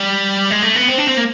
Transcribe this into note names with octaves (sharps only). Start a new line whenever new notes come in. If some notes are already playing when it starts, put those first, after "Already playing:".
Already playing: G3
G#3
A3
B3
C4
D4
C4
A#3